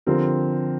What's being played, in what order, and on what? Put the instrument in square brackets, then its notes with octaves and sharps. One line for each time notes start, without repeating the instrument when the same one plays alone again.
[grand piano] D3 F3 C4 G4 A#4